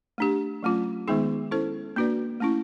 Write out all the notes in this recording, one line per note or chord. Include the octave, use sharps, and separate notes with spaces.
A3 D4 G4
F#3 A3 C#4 F4
D#3 G#3 B3 D#4 G#4
C#4 E4 A4 C5
A#3 D4 F#4 B4 D5
A3 C#4 E4